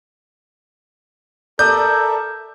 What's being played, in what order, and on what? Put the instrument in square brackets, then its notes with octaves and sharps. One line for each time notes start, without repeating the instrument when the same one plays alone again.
[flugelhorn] A4 [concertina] A#4 E5 [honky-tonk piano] D5 D#6 [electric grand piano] G6